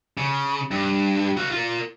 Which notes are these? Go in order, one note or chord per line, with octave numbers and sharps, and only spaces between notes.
C#3
G2
F#4 F5
F4 A#4